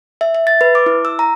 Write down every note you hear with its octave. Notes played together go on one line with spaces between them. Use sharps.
E5
E5
A6
B4
D6
E4
E6
A#5